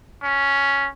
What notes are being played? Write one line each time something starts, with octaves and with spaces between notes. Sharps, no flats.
C#4